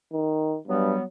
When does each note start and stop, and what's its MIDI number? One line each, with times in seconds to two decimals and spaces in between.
0.13 0.57 51
0.67 0.93 43
0.67 1.02 54
0.67 1.02 55
0.67 1.02 59